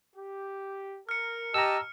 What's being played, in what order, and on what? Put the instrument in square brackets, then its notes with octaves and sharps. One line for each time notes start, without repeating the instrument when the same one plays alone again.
[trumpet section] G4
[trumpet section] A#4 [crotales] F6 C#7
[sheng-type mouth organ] G4 D#5 A5 [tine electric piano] A#5 E6